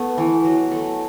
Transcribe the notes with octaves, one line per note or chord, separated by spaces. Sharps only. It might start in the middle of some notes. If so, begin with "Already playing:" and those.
Already playing: A3 B3
E3
F#3
A3